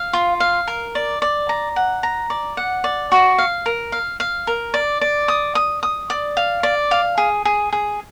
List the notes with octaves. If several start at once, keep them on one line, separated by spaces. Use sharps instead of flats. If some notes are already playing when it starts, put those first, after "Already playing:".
Already playing: F5
F4
F5
A#4
D5
D5
A#5
F#5
A#5
D5
F#5
D5
F#4
F5
A#4
F5
F5
A#4
D5
D5
D#6
D#6
D#6
D5
F5
D5
F5
G#4
G#4
G#4